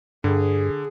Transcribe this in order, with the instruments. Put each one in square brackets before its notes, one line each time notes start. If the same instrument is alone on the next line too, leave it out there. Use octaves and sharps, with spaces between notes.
[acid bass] G2 [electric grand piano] D3 [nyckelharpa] G#4